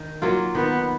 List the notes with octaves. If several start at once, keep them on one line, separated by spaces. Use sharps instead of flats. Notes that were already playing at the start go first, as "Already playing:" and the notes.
Already playing: D#3
F#3 A#3 F4
D#3 B3